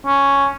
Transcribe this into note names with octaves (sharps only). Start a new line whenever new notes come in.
C#4